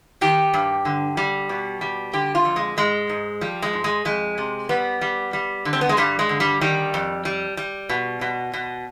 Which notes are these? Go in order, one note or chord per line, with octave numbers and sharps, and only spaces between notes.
D#3 G4
G2
D3
G3
B2
G3
D3 G4
F4
F2
G#3
G#2 G#3
G#2
F3 G3
G#3
G#2
G#3
F2 G#3
C3
G3 B3
G3
G3
D3
C4
B3
G#3
G2 G3
G#3
D3
G3
D#3 G3
F2
G3
G3
B2
B2
B2